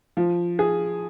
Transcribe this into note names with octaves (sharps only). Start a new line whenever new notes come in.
F3
G#4